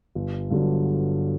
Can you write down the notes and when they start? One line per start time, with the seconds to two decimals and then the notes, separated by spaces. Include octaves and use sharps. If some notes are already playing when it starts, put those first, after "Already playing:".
0.15 G1
0.50 G2 D3 F#3